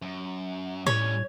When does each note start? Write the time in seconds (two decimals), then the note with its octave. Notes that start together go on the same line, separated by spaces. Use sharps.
0.02 F#2
0.86 A2 G3 C#4 C#5